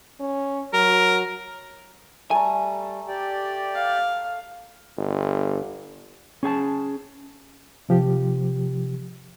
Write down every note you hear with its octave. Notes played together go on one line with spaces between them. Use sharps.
C#4
F#3 A#4
G3 A3 A4 G#5 A#5
G4 D5 G5
F5
G1
C#4 G#4 G#5 A5
C3 F3 G4